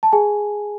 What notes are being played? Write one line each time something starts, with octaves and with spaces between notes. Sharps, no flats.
A5
G#4 G#5